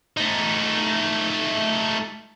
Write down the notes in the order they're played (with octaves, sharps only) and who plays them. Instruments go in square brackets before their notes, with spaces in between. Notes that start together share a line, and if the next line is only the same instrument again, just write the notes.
[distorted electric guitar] A3 D#4